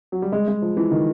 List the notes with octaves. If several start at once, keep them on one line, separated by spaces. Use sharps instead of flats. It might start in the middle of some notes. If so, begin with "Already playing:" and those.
F#3
G3
G#3
G#3
F3
E3
D#3